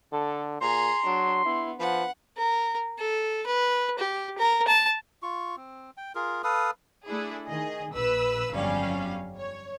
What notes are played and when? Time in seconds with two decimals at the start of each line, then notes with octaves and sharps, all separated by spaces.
0.13 D3 A4
0.61 A#2 G#4 A#5 C6
1.06 F#3 D4
1.45 B3 E4
1.80 F3 B4 F#5
2.37 A#4
2.99 A4
3.46 B4
3.99 G4
4.38 A#4
4.68 A5
5.22 F4 C#6
5.57 C4
5.97 G5
6.15 F4 G#4 A#4
6.44 A4 B4 F5 D#6
7.06 A3 D4 E4 G#4
7.46 D#3 G#4 D#5
7.93 A#1 B4 E6
8.52 G1 F2 F#3 G3 C#4 F5
9.37 C#5